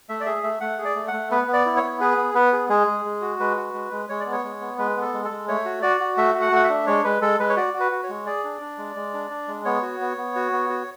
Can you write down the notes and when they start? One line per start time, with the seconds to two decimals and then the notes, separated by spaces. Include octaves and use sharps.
0.09 A3 E5
0.20 D5
0.26 G#4 E5
0.43 A3 E5
0.60 A3 F#5
0.78 G#4
0.85 D5
0.96 A3
1.08 F#5
1.13 A3
1.31 B3 B4
1.48 B3
1.53 D5
1.66 E4
1.77 C#5
1.83 B3
2.00 G#4 B4
2.17 B3
2.35 B3 B4
2.53 G#4
2.69 G#3 G#4
2.87 G#3
3.05 G#3
3.21 F#4
3.40 G#3 B4
3.57 F#4
3.74 G#3
3.91 G#3
4.09 G#3 C#5
4.20 D5
4.26 B3
4.32 C#5
4.44 G#3
4.61 B3
4.78 G#3 B4
4.96 B3
5.01 A4
5.14 G#3
5.25 A4
5.31 G#3
5.48 A3 C#5
5.65 F#4
5.82 F#4 D5
6.00 F#4
6.17 A3 E5
6.35 F#4
6.41 F#5
6.52 A3 F#5
6.64 E5
6.69 D4
6.87 G#3 C#5
7.04 G#3 B4
7.22 G#3 A4
7.40 G#3 B4
7.50 C#5
7.57 F#4 D5
7.74 F#4
7.80 B4
7.92 F#4
8.03 C#5
8.09 G#3
8.26 G#4 D5
8.44 D4
8.61 D4
8.78 G#3
8.96 G#3
9.14 D4
9.30 D4
9.48 G#3
9.65 B3 C#5
9.82 F#4
10.00 B3
10.17 B3
10.36 F#4
10.52 B3
10.70 F#4